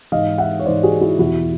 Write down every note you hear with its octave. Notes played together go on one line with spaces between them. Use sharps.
G#2 E3 D#5 F5
E5 F#5
C#5
G#2 E3 C5 D5
F#4 G#4
E4 F#4
E2 B2 E4 F#4